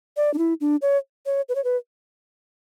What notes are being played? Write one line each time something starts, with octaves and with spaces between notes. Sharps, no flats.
D5
D4
E4
D4
C#5
C#5
B4
C#5
B4